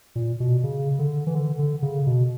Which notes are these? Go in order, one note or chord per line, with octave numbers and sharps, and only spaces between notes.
A#2
B2
C#3
D3
E3
D3
D3
C#3
B2